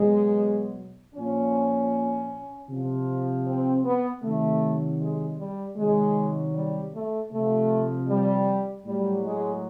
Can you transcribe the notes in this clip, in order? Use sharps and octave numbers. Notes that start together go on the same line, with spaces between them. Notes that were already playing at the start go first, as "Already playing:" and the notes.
Already playing: B2 F#3 G#3
A#2 F3 C#4
C3 F3
C4
B3
C3 D#3 F#3 A3
G#3
G3
C3 D#3 F#3 G#3
G3
A3
C3 F3 A3
G3
A2 F#3 G3
G#3